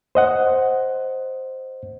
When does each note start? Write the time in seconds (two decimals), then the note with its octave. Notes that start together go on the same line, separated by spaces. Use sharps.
0.15 C5 D#5 F#5